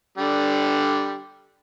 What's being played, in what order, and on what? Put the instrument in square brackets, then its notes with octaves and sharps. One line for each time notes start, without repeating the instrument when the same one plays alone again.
[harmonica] D3 G3